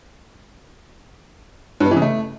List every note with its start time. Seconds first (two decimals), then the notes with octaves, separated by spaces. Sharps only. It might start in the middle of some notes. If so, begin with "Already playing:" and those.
1.80 G2
1.86 B3
1.91 E3
1.96 C#3
2.02 A3